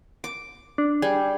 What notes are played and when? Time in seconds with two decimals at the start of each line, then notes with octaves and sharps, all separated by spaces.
0.24 D6
0.78 D4
1.02 G3 G#4